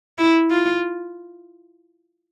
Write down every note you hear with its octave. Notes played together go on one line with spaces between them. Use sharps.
E4
F4